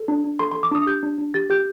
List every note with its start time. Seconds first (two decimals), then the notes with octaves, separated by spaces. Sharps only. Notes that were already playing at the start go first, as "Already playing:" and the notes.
Already playing: A4
0.08 D4
0.24 D4
0.39 A4 C6
0.52 C6
0.56 A4
0.63 D6
0.71 D4 D#6
0.86 G4 G6
1.03 D4
1.18 D4
1.34 G4 A6
1.50 G4 G6